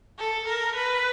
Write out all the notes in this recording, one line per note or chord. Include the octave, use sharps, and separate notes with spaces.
A4
A#4
B4